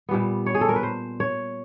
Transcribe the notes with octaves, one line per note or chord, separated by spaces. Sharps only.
A#2 G3 B3
C#5
G#4
A4
A#4
B4
C5
C#5